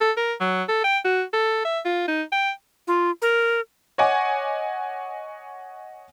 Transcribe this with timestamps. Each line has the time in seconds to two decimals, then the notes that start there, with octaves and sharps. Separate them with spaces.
0.01 A4
0.17 A#4
0.41 F#3
0.68 A4
0.84 G5
1.04 F#4
1.33 A4
1.65 E5
1.85 F4
2.08 D#4
2.32 G5
2.87 F4
3.22 A#4
3.98 C#5 D#5 F#5 G#5 D6